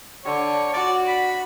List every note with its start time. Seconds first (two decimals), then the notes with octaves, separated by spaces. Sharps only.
0.25 D3 C#5
0.73 F#4 D5
1.08 B5